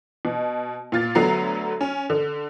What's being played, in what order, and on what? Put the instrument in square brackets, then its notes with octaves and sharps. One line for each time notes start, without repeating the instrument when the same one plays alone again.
[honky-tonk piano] B2
A#2 F4 A6
D2 D3 F#3 B3 A#5 C7
C#4
D3